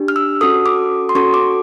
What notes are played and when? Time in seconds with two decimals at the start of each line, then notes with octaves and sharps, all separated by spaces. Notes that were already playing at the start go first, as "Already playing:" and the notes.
Already playing: D4 G4
0.08 F6
0.16 E6
0.41 C#4 F#4 A4 D#6
0.66 D6
1.09 C6
1.15 C#4 F#4 A4 C#6
1.34 D6